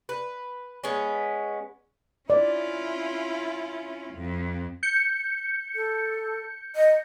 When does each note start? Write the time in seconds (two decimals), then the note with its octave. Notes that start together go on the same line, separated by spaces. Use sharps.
0.09 B4
0.84 G#3 B3 C#4
2.30 C#4 E4 F4 D5
4.13 F2
4.83 G6 C#7
5.75 A4
6.76 D#5